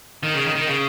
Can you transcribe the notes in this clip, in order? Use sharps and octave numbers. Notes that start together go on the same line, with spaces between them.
D#3
C#3
D#3
D#3
C#3